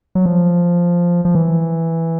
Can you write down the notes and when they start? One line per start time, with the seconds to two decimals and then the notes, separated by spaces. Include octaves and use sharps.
0.15 F#3
0.26 F3
1.25 F3
1.35 E3